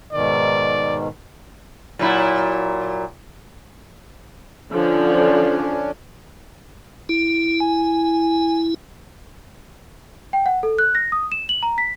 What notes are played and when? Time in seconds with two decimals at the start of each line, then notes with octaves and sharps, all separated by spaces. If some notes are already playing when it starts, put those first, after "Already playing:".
0.12 G#2 B2 D#3 D5
1.99 A#2 F#3 E4
4.71 D3 F3 C#4 D4
7.09 E4 D7
7.60 G#5
10.33 G5
10.46 F#5
10.63 A4
10.79 F#6
10.95 A#6
11.12 D#6
11.32 E7
11.49 F#7
11.63 A#5
11.78 B6